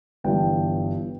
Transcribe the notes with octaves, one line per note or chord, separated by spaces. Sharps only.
G1 G2 E3 G5